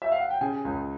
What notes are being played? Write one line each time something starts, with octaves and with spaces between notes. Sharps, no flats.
E5
F5
F#5
G5
C#3 G#5
C#2